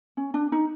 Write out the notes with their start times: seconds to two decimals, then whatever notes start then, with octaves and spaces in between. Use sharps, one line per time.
0.17 C#4
0.34 D4
0.52 D#4